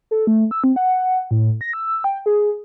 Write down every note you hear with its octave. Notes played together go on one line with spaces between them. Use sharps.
A4
A3
E6
C4
F#5
A2
A#6
E6
G5
G#4